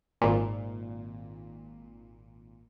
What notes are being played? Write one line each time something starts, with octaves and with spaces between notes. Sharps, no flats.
G#1 A#2